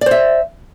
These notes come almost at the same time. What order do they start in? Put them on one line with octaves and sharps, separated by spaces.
D5 C5 E5